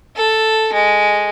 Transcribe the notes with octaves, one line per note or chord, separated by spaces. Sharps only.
A4
G#3